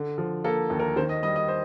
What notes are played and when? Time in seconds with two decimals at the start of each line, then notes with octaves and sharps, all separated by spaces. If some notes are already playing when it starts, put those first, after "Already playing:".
Already playing: D3
0.18 F3
0.44 A#3 A4
0.70 D#2
0.80 A#4
0.96 D#3 C5
1.09 D#5
1.23 G3 D#5
1.36 D#5
1.48 C5